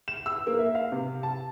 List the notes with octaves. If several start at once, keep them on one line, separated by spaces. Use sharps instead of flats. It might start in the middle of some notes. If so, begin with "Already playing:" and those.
E7
E6
A#3
E5
F5
C3
A5